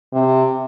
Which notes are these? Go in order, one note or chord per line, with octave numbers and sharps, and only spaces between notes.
C3